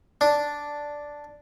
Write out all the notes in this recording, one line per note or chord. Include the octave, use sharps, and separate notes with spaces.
D4